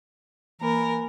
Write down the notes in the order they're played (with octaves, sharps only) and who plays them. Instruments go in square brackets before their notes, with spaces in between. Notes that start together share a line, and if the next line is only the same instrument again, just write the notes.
[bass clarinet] E3 [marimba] A#3 [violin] A#4